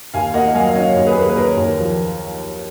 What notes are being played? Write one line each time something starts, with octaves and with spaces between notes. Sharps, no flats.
D#2 F5 G#5
A#3 D#5 F#5
F#3 F5 G#5
D#5
C#3 C#5 F5
D#2
G#4 B4
A#3
B4
D#2 A#4 C#5
D#2
F3